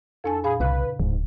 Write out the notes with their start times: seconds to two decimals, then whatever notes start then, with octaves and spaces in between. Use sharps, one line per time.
0.24 F2 D4 A4 G#5
0.44 A#2 G#4 F5 B5
0.60 C2 C#3 B4 F5
1.00 D1 G#2